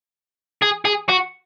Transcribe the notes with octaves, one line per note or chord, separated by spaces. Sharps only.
G#4
G#4
F#4